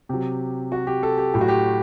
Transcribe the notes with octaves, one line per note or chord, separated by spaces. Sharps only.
C3 F#3 G4
F#4
G4
A4
G4
A2 F#3 G4
F#4
G4